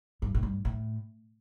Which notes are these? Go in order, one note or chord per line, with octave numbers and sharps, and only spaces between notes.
G2
A2
G2
A2